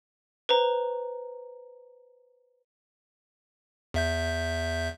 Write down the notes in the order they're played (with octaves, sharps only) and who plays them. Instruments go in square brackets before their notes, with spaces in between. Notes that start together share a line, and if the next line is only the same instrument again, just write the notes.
[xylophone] B4 C5 A#5
[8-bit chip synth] E2 E5 G6